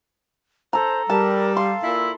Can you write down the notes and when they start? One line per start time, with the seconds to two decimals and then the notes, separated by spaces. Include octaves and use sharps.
0.73 A4 C5 A#5
1.10 G3 A#4 A5
1.57 F5 C6
1.83 A#2 E4